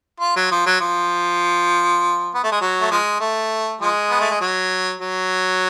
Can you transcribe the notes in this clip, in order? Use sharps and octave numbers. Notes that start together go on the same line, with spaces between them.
F4
F#3
F3
F#3
F3
B3
A3
G#3
F#3
A3
F3 G#3
A3
F3 G#3
B3
A3
G#3
F#3
F#3